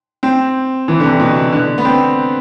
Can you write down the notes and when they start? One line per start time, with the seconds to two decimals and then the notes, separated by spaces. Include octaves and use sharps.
0.23 C4
0.88 E3
1.00 D3
1.04 C3
1.20 B2
1.52 D3
1.78 B3
1.85 C4